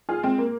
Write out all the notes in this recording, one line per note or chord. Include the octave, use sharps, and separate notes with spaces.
F4 G#4
G#3 C4
A#3